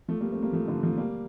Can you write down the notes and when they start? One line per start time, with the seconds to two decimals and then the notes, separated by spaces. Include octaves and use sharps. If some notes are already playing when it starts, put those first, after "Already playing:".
0.08 F3 A3
0.20 G3 A#3
0.32 A3 C4
0.42 G3 A#3
0.53 F3 A3
0.68 D3 F3
0.83 F3 A3
0.97 G3 A#3